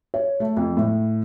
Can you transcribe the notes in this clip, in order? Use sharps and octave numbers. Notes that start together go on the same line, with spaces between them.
C#5
A3
F2
A2